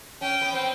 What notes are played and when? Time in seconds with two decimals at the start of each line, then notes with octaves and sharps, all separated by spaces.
0.21 C#4 G5
0.42 B3
0.53 C4